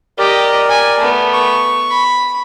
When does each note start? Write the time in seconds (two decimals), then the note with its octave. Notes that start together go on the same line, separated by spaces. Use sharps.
0.18 G4 A#4 D5 D#5
0.70 G#5
0.99 A3 B3
1.33 C#6
1.91 B5